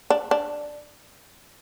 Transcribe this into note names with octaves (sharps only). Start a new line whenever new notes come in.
D4
D4